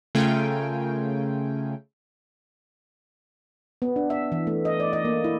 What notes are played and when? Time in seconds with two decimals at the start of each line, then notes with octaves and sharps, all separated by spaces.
0.15 C#3 A3 F4 A#4 G5 G#5
3.82 B3
3.96 D4
4.10 E5
4.32 E3
4.47 A3
4.65 D#5
4.80 D5
4.93 D#5
5.05 A#3
5.24 E4